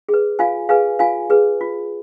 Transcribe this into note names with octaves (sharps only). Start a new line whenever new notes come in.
G#4
B4
F4 F5 G#5
G#4 B4 F5 G#5
F4 F5 G#5
G#4 B4
F4